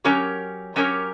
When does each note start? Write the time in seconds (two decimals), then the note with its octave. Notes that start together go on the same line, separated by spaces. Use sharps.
0.05 F#3 C#4 G4 A#4 C#5
0.76 F#3 C#4 G4 A#4 C#5